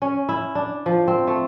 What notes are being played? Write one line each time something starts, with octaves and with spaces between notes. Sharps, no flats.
C#4
E4
D4
F3
C4
A3